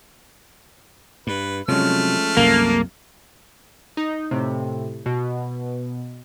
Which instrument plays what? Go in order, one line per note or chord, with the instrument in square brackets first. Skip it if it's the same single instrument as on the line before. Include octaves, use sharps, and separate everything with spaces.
[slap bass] G2 [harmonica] B4
[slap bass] C3 F#3 [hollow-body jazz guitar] F3 G#3 C#4 [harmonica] A3 F6
[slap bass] C2 F#2 C3 [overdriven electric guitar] A#3
[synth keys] D#4
A2 C3
B2